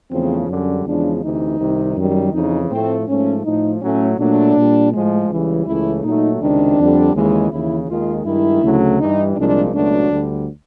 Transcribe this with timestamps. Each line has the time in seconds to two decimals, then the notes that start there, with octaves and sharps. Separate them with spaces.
0.11 E2 C#3 F3 A3 C4
0.48 F#2 D3 G3 C#4
0.85 E2 C#3 F3 G#3 D4
1.22 D2 C3 E3 D#4
1.58 C2 C3 D#3
1.95 F#2 D#3 G3
2.33 F2 C#3 E3 D#4
2.69 A2 F3 A3 C4
3.07 G#2 F3 A3 C#4
3.44 A2 F3 A3 D#4
3.81 A2 F#3 A3 C#4
4.18 A#2 F#3 A3 D4
4.55 A#2 G3
4.92 A2 F3 G#3
5.29 C#2 C#3 E3 G3
5.66 C#2 C#3 E3 A3 E4
6.02 A#2 F#3 A3 D#4
6.40 C#2 C3 D#3 D4
6.77 F2 D3 G3
7.14 D#2 C#3 E3 G#3
7.51 D#2 C#3 E3 E4
7.88 D#2 D#3 G#3 F4
8.25 G2 D#3 G#3 E4
8.62 D2 C#3 F#3 A3
8.99 G2 E3 G3 D#4
9.36 C2 A#2 F3 G#3 D4
9.73 C#2 B2 F#3 A3 D4
10.10 D2 D3 G3